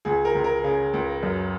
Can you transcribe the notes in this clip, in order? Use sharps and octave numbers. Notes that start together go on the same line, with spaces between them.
C#2 G#4
A#4
C#2
A#4
C#3 G#4
C#2
F#2